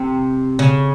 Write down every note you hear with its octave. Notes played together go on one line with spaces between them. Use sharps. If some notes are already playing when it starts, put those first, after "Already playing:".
Already playing: C3
C#3